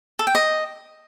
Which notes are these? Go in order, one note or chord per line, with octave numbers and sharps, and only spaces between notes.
A4
G5
D#5